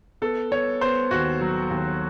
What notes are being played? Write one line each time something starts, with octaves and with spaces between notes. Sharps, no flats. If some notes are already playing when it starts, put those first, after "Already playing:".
B3 A4
B3 C#5
B3 C5
D#2 F#4
F#3
D#2